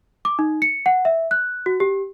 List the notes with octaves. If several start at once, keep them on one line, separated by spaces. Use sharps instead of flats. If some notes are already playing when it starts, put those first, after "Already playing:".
D6
D#4
C#7
F#5
E5
F#6
F#4
G4